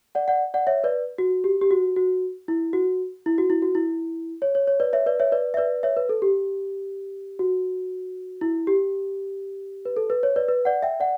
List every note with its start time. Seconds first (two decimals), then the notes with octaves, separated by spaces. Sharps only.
0.15 D5 F#5
0.28 D5 F#5
0.54 D5 F#5
0.67 C#5 E5
0.84 B4 D5
1.18 F#4
1.44 G4
1.61 G4
1.71 F#4
1.96 F#4
2.48 E4
2.73 F#4
3.26 E4
3.38 F#4
3.50 E4
3.62 F#4
3.75 E4
4.42 C#5
4.55 C#5
4.67 C#5
4.80 B4 D5
4.93 C#5 E5
5.06 B4 D5
5.20 C#5 E5
5.32 B4 D5
5.54 E5
5.57 B4 D5
5.83 C#5 E5
5.97 B4
6.09 A4
6.22 G4
7.39 F#4
8.41 E4
8.67 G4
9.85 B4
9.97 A4
10.10 B4
10.23 C#5
10.36 B4 D5
10.48 B4
10.65 D5 F#5
10.83 E5 G5
11.00 D5 F#5